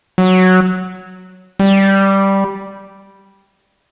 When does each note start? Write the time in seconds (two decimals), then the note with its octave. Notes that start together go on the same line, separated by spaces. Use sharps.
0.18 F#3
1.60 G3